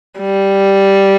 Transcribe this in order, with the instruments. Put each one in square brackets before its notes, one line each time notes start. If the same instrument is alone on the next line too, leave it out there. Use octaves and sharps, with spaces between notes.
[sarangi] G3